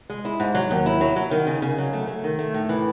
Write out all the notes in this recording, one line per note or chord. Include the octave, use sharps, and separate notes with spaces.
G#3
E4
G#2
F#3
D#2
E4
F#3
F#3
D#3
C#3
C#3
F#3
A3
A3
D#3
A3
A2
E3